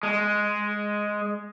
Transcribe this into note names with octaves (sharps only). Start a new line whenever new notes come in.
G#3